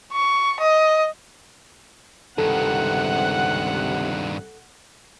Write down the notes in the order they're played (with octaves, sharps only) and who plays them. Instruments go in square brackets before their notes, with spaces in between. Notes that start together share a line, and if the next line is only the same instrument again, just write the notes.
[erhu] C#6
D#5
[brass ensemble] C#2 C3 [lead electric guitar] G2 D#3 [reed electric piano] A4 [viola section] F#5